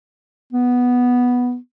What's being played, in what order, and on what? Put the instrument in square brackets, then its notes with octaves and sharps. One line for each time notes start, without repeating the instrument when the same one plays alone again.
[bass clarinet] B3